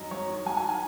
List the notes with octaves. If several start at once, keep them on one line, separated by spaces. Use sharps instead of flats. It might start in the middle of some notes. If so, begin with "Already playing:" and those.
Already playing: F#2 D#3 D#5
F#2 C#5
D#3
F#2 G#5
G#5
D#3
G#5